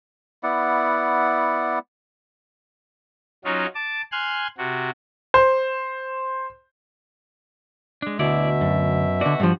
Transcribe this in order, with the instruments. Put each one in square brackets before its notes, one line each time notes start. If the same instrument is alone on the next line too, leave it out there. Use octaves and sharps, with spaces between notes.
[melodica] B3 E4 D5 F#5
[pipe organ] F#3 C#4 D#4 F4 F#4
A5 D6
G#5 C6 F6 F#6 G#6
C3 F#4
[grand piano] C5
[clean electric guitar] G#3 D4
[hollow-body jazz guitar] D2 [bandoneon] B2 E5 [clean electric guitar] E4 D5
[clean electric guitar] F#2
[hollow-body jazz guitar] D3 D5 [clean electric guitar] F#4
[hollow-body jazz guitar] G2 F3